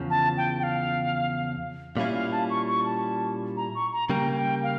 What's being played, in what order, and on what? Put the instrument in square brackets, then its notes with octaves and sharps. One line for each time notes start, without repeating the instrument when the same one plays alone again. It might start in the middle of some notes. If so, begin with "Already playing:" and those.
Already playing: [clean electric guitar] E2 C#3 F3
[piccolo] A5
G5
G5
F5
[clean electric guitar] A#2 G3 C#4 E4 [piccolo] F5
[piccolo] F5
A5
C#6
C#6
A5
A#5
C#6
A#5
[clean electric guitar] C#3 G3 A#3 [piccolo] G5
[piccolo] G5
F5